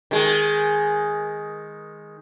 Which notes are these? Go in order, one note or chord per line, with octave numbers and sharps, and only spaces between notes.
D#3 G#3